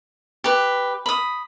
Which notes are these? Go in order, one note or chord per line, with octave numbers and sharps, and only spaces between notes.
G4 B4
B5 D#6